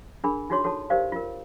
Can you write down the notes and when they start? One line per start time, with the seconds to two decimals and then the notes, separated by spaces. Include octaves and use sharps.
0.24 D4 G#4 A#4 G#5 B5
0.50 D#4 F4 F#4 G#4 C#5 C6
0.64 F#4 A4 C#5 A5
0.90 G4 A#4 C5 D5 F5
1.12 F4 A#4